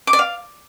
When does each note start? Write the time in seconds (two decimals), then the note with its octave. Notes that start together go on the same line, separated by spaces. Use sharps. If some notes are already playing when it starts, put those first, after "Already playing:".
0.07 D6
0.13 D5
0.19 F5